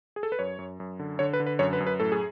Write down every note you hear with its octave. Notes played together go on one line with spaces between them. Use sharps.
G#4
A4
B4
F#2 C#5
F#2
F#2
D3
D3 C#5
B4
D3
B4
F#2 C#5
B4
F#2
B4
A2 A4
G#4